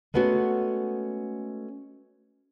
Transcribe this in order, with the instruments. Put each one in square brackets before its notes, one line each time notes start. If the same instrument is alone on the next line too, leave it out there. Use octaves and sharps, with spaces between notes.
[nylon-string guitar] G#3 A3 B3 C#4 F#4